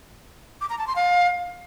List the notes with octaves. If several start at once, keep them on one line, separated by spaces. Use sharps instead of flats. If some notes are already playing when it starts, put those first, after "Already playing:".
D6
A#5
A5
C6
F5